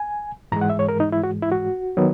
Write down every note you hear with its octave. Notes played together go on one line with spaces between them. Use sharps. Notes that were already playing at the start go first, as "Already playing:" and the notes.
Already playing: G#5
G#2 E3 G#3 A#5
F#5
E5
C#5
A#4
D#4
E4
F#4
E4
F#4
D#3 F#3 B3